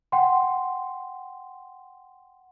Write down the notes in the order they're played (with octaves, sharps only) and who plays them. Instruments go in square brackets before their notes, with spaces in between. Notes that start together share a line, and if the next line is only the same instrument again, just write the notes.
[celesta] F#5 G5 C6